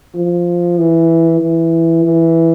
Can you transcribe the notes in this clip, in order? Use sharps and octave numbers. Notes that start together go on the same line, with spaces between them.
F3
E3
E3
E3